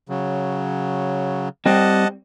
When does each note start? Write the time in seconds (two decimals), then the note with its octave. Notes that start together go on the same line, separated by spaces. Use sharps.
0.09 C#3 F#3
1.66 G3 C4 D#5 F#5 A5